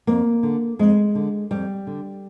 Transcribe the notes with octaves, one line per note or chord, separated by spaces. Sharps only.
F2 A#3
D3
F2 G#3
D3
F2 G3
D3